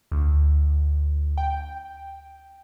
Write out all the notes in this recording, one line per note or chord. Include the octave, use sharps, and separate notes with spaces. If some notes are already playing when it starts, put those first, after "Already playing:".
D2
G5